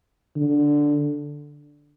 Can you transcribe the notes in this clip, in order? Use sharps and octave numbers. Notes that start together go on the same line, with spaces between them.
D3